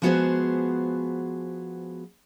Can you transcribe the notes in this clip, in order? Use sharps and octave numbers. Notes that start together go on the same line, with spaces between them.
F3 G#3 B3 F#4 G#4 C5